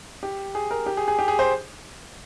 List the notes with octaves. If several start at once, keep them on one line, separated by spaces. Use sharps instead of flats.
G4
G#4
A#4
G4
G#4
G#4
G4
G#4
C5